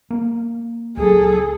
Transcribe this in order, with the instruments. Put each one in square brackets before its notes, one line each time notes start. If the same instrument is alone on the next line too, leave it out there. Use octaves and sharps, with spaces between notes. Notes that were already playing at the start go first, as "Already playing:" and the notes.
[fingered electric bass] A#3
[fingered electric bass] C#2 F#3 [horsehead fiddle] G#4 A4